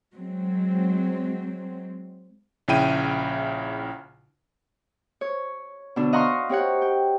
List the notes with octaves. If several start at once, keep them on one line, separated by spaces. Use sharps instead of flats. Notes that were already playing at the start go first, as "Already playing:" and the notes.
F#3 G#3 C4
A#1 C#3 E4 G5 D#7
C#5
B2 D3 D4
D#5 F5 F#5 A#5 C6 C#6
C4 G4 C#5 F#5
G5